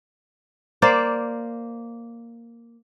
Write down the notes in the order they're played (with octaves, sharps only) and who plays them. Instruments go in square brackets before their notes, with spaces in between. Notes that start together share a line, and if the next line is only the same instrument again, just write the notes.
[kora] A#3 C5 D5